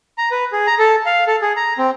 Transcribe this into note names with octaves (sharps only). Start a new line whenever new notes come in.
A#5
B4
G#4
A#5
A4
F5
A4
G#4
A#5
C4